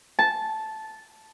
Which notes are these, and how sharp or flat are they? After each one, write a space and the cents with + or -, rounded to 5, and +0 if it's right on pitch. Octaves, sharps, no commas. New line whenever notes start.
A5 -10